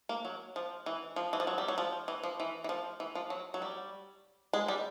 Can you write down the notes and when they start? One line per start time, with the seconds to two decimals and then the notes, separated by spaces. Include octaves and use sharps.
0.09 A#3
0.25 F#3
0.56 F3
0.86 E3
1.16 F3
1.33 E3
1.40 F3
1.47 F#3
1.58 G3
1.68 F#3
1.78 F3
2.08 E3
2.23 F3
2.40 E3
2.64 E3
2.69 F3
3.00 E3
3.15 F3
3.30 F#3
3.54 F#3
3.62 G3
4.53 G#3
4.68 G3